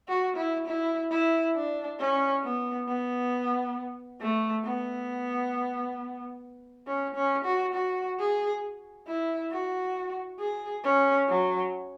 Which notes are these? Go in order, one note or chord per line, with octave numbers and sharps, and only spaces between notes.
F#4
E4
E4
E4
D4
C#4
B3
B3
A3
B3
C#4
C#4
F#4
F#4
G#4
E4
F#4
G#4
C#4
F#3